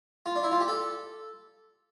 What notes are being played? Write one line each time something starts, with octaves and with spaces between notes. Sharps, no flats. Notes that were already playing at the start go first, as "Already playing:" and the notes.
F4
D4
E4
F4
G4
A4